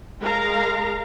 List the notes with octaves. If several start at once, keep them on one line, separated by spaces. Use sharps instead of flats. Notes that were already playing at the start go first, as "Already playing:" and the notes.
G#3 A#4 F5 A#5